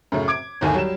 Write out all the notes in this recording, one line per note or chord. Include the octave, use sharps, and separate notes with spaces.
F#2 A2 C#3
D6 G#6 D7
G1 D#2 A2 G#5
F#3 G3 E7